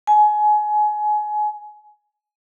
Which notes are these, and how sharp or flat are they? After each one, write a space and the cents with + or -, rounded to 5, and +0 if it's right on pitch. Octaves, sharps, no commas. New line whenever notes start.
G#5 +25